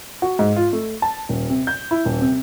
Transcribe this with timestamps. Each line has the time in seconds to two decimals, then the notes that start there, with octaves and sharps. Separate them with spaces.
0.22 F#4
0.39 G#2
0.56 F4
0.73 A3
1.02 A5
1.29 D#1
1.50 C3
1.67 G6
1.91 E4
2.05 D#1
2.21 C3